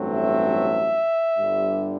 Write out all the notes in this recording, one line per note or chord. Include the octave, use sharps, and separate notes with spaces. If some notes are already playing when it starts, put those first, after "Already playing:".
Already playing: A1 G2 F#3 A3 C4
E5
G1 G2 D3 G3